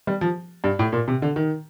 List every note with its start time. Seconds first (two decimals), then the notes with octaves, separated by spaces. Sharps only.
0.07 G3
0.21 F3
0.64 G2
0.79 A2
0.93 A#2
1.08 C3
1.22 D3
1.36 D#3